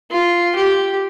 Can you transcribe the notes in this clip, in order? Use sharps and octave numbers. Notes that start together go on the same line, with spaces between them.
F4
G4